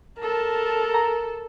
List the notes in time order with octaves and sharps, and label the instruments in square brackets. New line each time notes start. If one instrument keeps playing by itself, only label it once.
[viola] A4 A5 [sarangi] A#4
[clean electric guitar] A#5